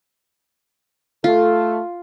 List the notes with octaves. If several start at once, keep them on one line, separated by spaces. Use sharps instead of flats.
A3 F4 A4